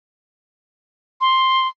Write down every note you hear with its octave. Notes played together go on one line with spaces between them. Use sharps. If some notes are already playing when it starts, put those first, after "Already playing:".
C6